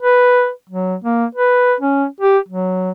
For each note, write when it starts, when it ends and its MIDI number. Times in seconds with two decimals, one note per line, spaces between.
0.03 0.50 71
0.70 0.95 54
1.04 1.26 58
1.35 1.74 71
1.81 2.05 61
2.21 2.38 67
2.49 2.91 54